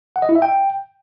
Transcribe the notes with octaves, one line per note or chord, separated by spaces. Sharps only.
F#5
D#5
E4
E5
G5